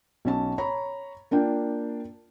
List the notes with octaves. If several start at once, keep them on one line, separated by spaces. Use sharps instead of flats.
B1 C#4 A5
C#5 A#5 B5
A#3 D4 F4 G5